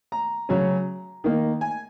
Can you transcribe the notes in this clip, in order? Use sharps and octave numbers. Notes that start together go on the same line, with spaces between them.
A#5
C#3 F#3 C#4
D#3 A#3 D#4
G#5